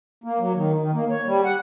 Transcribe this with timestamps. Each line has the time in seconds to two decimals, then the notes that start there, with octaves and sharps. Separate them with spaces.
0.24 A#3
0.39 F#3
0.56 D#3
0.80 D#3
0.94 A#3
1.10 C#5
1.26 G3
1.45 F#5